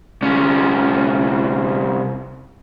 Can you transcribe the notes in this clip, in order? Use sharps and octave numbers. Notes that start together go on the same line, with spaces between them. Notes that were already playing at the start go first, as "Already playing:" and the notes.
C2 C#4